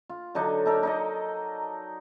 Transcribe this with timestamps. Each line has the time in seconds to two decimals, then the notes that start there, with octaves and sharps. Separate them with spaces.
0.09 F4
0.35 D3 F#3 D4 D#4
0.66 D#4 A4 A#4 D5
0.83 D#4 D5 D#5